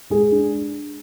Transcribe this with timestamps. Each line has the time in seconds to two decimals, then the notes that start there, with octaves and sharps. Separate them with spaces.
0.10 G#3 G#4
0.32 D4